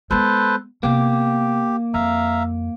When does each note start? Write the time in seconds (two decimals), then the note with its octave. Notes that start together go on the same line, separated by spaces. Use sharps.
0.11 G#3 B3 A4 B4 C5
0.83 C3 A#3 B3 G4
1.94 F2 E5 F5 A#5